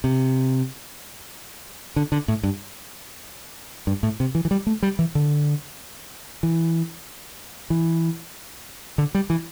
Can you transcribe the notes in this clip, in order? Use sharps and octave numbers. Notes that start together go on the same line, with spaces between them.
C3
D3
D3
A2
G2
G2
A2
C3
E3
E3
G3
A3
G3
E3
D3
E3
E3
D3
G3
E3